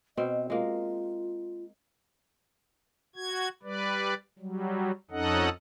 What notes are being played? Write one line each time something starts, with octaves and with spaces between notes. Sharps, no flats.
B2 C4 D#5
G#3 A#3 F4
F#4 G#6
G3 B4 D5
F#3 G3
F2 C#4 D#4 A4 D#5 F#5